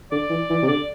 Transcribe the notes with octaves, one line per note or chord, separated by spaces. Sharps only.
D3 D5
E3
E3
C3
D3 D5